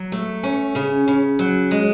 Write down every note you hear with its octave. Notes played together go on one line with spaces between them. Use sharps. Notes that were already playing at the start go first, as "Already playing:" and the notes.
Already playing: F#3
A3
C#4
C#3
C#3
F#3
G#3